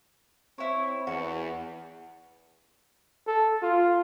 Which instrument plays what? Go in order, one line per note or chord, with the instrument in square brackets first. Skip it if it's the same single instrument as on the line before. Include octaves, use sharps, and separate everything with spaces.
[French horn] C4 [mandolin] E4 C#5
[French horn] E2 [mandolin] F#4
[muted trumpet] A4
F4